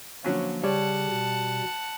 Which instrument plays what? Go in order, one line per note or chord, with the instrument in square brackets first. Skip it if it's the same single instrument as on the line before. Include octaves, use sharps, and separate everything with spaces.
[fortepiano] D3 F#3 C#4 [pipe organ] F3 A#3
[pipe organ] C#3 [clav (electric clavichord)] G3 [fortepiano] C#5 [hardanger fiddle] F#5 A5
[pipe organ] B2